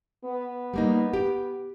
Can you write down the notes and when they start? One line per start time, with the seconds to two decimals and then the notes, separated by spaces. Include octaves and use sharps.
0.25 B3
0.74 G3 A#3 D#4
1.13 G4 G5